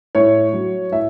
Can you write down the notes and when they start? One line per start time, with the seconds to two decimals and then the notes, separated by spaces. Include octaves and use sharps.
0.15 A2 C#5
0.53 F#3
0.92 A2 E5